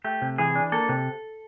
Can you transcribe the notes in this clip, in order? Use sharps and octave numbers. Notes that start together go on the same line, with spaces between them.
A3 G4
C3
E3 G#4
D4
A#3 A4
C3